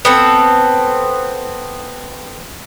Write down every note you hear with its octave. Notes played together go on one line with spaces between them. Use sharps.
B3 C4 A4